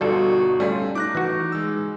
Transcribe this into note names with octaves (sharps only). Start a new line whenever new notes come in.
G1 B2 G3 D#4 F4 F#4 A4
G3 A3 C#4 F4
D#4 D6 F#6 A#6
E3 F#4
G#3 E6